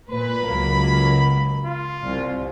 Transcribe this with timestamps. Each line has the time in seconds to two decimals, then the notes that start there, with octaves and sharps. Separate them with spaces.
0.11 A#2 B4 B5
0.47 C#2 F#3 A#3
1.66 F4
2.02 C2